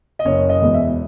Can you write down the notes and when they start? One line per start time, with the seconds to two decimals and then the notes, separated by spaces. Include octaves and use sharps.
0.19 D#5
0.25 F#1 C#5
0.49 D#5
0.62 E2 B2 G#3
0.74 E5